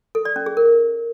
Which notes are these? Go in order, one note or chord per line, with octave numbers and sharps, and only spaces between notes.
A4
D5
C#4
G#4
A#4